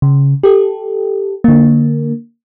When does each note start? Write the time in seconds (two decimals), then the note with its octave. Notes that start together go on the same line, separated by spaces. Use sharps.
0.02 C#3
0.43 G4 A4
1.44 D3 A#3